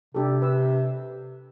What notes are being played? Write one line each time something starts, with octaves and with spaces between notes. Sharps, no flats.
C3 D4 G4 A4
B4 E6